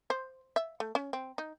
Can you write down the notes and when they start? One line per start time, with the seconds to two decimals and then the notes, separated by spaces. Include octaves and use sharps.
0.10 C5
0.56 E5
0.80 A3
0.95 C#4
1.13 C4
1.38 D#4